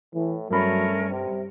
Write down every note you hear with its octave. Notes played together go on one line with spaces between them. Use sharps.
A2 E3
G2 F#3 A3 C#4 A#4 B5
C3 G3